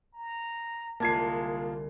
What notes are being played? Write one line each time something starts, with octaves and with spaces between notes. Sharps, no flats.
A#5
C2 D3 G#3 A#3 F4 A5 G#6 C7